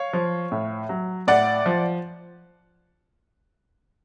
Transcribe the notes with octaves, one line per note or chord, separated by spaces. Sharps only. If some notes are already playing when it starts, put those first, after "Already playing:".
Already playing: C#5 F5
F3
A2
F#3
A2 D5 F#5
F3